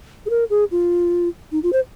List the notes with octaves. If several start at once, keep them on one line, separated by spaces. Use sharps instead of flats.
G#4
A#4
G#4
F4
D#4
F4
C5